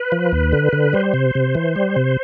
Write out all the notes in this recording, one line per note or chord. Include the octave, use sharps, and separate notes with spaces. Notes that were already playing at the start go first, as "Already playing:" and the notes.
Already playing: B4
F3
D#2
D3
D3
G3 C5
C3
C3
E3
G3
C3